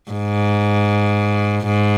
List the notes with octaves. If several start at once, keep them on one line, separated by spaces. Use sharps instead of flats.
G#2
G#2